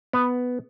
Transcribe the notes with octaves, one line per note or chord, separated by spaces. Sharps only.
B3